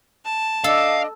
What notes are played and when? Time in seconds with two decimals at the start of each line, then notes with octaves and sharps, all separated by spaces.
0.25 A5
0.64 D4 A4 D#5 F5